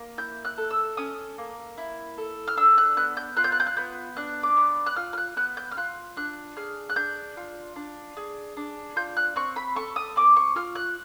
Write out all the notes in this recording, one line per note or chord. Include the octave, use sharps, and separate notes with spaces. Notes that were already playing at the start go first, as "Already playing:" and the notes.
Already playing: A#3
E4 G6
F#6
A4
E6
C#4 D#6
A#3
E4
A4
F6
D4 E6
F#6
B3 F#6
G6
F4 F#6
G6
F#6
G6
F#6
B3 G6
D4 F#6
D6
B3
F#6
F4 F6
F6
F#6
B3 F#6
G6
F6
F4 F#6
D4 F#6
G#4 F6
F#6
D4 G6
F4
D4
G#4
D4
F4 G6
F#6
C4 C#6
B5
A4 C#6
D#6
C4 D6
C#6
F4 F6
F#6